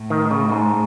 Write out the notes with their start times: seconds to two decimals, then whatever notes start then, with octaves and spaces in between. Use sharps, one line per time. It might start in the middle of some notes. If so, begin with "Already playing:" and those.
Already playing: A2
0.10 D#3
0.31 C#3
0.51 G#2